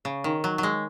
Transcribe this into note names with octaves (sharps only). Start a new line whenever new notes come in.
C#3
D#3
F#3
F#3
G#3